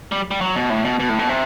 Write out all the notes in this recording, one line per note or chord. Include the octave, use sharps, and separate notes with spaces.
G3
G3
F#3
B2
A2
B2
B2
A2
B2
C3